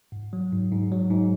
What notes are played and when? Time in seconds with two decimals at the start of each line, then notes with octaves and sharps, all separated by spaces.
0.12 G#2
0.33 F#3
0.52 G#2
0.72 G#2
0.92 F#3
1.10 G#2